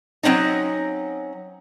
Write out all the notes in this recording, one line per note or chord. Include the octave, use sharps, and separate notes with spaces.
F#3 A#3 C4 C#4 D#4